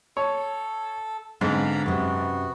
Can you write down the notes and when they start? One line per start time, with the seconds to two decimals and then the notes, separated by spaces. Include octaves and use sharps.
0.17 A4 C#5
1.41 G#2 D3 B3 C4 F5 A#5 B5
1.86 F#2 C3 B3 F#4